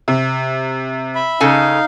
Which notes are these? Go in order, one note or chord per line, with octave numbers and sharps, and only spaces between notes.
C3
E5 B5
C#3 D#4 A4 F5 G#5